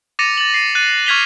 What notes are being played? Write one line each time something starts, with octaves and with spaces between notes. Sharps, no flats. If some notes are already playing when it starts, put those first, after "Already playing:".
D6 A6 A#6 C#7 D#7 F7
A6 F#7
C7 D#7
F#6 A6 D#7
C#6 F6 G#6 B6 F7 G7